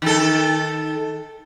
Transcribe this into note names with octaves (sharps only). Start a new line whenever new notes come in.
D#3 A4